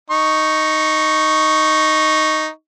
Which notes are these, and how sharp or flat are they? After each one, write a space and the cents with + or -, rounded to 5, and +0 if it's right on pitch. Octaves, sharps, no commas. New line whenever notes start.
D#4 +0 C#6 +0